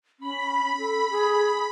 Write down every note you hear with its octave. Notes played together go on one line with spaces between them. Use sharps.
C#4 B5
A4
G#4